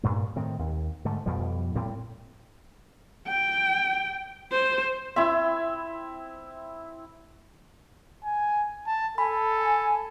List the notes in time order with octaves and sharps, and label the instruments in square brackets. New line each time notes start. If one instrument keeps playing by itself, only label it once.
[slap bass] G2 A#2 A3
A2 D#3 C4
D#2
G#2 D3 A3
F2 B2 F3 G3
A2 G3 C4
[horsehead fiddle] G5
C5
[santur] C4 E4 [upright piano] E5
[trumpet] G#5
A5
[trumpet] A4 [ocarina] G#5 [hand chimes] B5